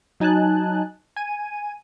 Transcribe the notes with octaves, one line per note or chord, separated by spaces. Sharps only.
F#3 D#4 G#5 A5 F#6
G#5 D#7